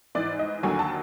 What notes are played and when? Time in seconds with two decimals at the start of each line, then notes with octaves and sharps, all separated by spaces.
0.15 G#2 E3 D5
0.39 D#5
0.63 D#2 D3 F#3 G#5
0.79 A5